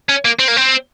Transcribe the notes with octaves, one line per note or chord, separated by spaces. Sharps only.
C#4
A#3
C4
A#3
C4